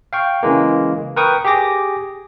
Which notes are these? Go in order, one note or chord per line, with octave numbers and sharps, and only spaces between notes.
F5 G5 C#6
C#3 E3 G#3 A#3
A#4 B4 G5 C#6 D#6
G4 G#4 D6 A#6